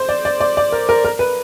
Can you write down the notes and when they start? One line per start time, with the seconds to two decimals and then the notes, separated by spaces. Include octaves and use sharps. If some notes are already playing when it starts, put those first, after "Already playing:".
Already playing: C5
0.09 D5
0.25 D5
0.40 D5
0.57 D5
0.72 A#4
0.89 A#4
1.05 A#4
1.19 B4